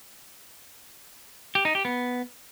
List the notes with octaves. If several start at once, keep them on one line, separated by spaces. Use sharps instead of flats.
G4
D#4
G4
B3